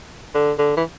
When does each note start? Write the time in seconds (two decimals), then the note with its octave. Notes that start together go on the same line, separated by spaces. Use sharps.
0.35 D3
0.59 D3
0.77 E3